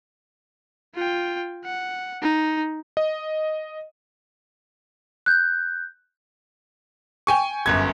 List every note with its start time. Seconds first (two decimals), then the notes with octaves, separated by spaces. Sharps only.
0.95 F4 G5
1.64 F#5
2.22 D#4
2.97 D#5
5.26 F#6 G6
7.27 G5 G#5 C#6
7.66 G1 F#2 G#6